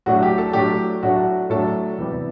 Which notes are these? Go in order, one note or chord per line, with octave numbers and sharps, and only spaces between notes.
A2 F#3 A3 D4 F#4
G4
A4
A2 F#3 A3 D4 G4
A2 F#3 A3 D4 F#4
A2 F#3 A3 D4 A4
E2 C3 E3 G3 B3